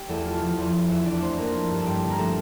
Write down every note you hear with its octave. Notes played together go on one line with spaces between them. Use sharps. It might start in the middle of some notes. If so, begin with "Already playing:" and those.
Already playing: G4
E2 A3 A4
A3 F4
F3
E2
E2
F2 E4 E5
E3 D4 D5
A3 C4 C5
F2 A#3 A#4
A3
G2
A4
G2 G3 G4
D3
A#4
F3 A3 A4